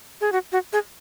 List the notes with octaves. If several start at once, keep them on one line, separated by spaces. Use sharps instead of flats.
G#4
F#4
F#4
G#4